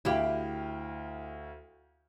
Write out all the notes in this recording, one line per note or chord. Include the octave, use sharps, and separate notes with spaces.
D2 E4 G4 F5 G5